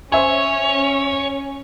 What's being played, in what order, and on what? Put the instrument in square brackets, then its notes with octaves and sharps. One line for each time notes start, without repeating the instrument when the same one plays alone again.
[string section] C#4 [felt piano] C5 E5 G#5 [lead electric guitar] C#5